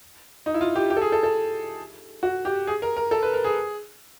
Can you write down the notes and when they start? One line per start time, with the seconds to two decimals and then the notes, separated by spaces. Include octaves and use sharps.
0.46 D#4
0.54 E4
0.61 F4
0.76 G4
0.90 G4
0.97 A4
1.01 G#4
1.12 A4
1.23 A4
2.23 F#4
2.45 G4
2.67 G#4
2.82 A#4
2.97 A#4
3.11 A4
3.23 B4
3.34 A#4
3.44 G#4